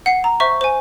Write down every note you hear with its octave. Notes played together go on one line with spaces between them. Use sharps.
F#5 C7
A#5
C5 E5 C#6
C5 G#5